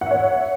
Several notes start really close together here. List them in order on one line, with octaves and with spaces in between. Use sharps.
F#5 E5 C#5